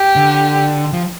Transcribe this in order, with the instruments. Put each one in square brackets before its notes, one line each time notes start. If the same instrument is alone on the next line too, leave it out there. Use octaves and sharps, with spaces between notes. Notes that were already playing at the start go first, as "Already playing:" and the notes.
Already playing: [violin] G4
[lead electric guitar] D3
F3